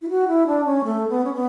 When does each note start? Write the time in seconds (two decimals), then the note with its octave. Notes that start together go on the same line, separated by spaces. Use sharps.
0.02 E4
0.09 F#4
0.28 E4
0.47 D4
0.65 C#4
0.84 A3
1.09 B3
1.24 C#4
1.33 B3